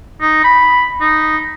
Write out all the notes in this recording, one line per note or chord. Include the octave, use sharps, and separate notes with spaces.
D#4
B5
D#4